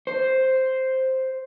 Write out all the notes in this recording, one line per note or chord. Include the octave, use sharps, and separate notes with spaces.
C5